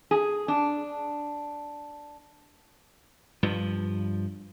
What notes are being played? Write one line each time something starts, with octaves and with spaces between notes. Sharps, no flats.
G#4
D4
G2 F3